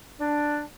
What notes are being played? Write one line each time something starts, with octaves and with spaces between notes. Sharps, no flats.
D4